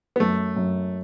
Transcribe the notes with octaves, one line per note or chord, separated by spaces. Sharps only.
B3
F#2 A3
F#2